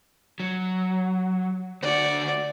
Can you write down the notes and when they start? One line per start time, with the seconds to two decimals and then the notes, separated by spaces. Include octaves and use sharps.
0.40 F#3
1.82 D2 F#4 D5